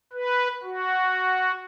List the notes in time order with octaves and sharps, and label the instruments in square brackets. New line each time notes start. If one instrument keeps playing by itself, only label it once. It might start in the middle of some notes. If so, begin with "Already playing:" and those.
[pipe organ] B4
F#4